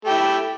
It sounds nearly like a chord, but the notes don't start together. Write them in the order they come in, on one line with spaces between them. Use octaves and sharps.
A3 G4 E4